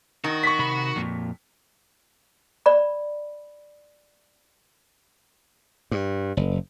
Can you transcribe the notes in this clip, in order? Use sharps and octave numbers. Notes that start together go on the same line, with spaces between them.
D#3 F#4
C#6 B6
C3 B5
F2 A#2
D5 B5
G2
F#1